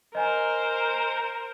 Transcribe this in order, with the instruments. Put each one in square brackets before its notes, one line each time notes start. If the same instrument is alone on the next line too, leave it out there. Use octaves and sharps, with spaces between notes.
[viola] A#4 C5 [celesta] D#5 G#5 A#5